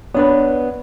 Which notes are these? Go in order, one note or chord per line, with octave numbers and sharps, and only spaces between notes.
B3 D4 B4 C#5